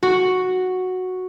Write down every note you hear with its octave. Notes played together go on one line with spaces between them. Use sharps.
F#4